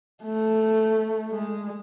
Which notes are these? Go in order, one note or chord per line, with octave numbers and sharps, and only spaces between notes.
A3
G#3